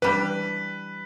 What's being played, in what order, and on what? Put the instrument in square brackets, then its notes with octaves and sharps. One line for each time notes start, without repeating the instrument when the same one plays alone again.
[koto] E3 G3 D4 G4 [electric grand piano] B4